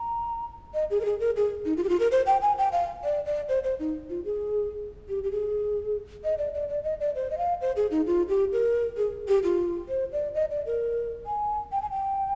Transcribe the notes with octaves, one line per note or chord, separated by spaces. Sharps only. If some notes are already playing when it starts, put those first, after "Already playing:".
Already playing: A#5
D#5
G#4
A#4
G#4
A#4
G#4
D#4
F4
G4
F4
A#4
C5
G5
G#5
G5
F5
D5
D5
C5
C5
D#4
F4
G#4
G4
G4
G#4
D#5
D5
D5
D5
D#5
D5
C5
D#5
F5
C5
G#4
D#4
F4
G4
A#4
G#4
G4
F4
C5
D5
D#5
D5
A#4
G#5
G5
G#5
G5